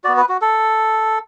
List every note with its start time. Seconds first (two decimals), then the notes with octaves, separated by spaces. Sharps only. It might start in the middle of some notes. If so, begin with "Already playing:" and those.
0.04 F#4 D5
0.08 B3
0.17 B4
0.29 F#4
0.41 A4